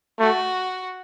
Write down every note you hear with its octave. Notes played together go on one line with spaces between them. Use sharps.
A3 F#4